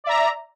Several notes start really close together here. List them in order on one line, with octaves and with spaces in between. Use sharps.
D5 E5 A#5